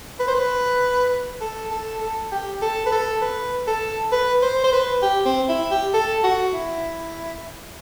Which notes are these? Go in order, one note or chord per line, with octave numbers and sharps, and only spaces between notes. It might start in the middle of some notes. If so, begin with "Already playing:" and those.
B4
C5
B4
A4
A4
A4
G4
A4
B4
A4
B4
A4
B4
C5
C5
B4
G4
C4
E4
G4
A4
F#4
E4